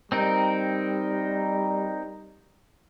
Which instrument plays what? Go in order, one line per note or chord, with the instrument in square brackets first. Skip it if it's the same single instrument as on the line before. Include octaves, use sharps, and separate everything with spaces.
[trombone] G3 [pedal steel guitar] C4 D#4 A#4